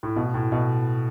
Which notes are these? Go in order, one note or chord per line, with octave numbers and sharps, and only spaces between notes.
A2
B2
A2
B2